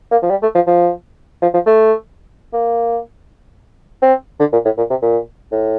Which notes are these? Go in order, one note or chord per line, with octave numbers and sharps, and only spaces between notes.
A#3
F3
G3
A3
F3
F3
F3
F3
A3
A#3
C4
D3
A#2
A2
A#2
C3
A#2
A2